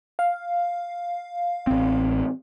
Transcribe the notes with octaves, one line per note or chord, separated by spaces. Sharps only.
F5
A1 C4